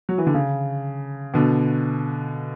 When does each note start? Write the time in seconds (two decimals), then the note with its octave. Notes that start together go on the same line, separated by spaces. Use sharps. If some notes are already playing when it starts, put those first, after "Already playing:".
0.09 F#3
0.18 E3
0.27 D3
0.34 C#3
1.34 B2 D3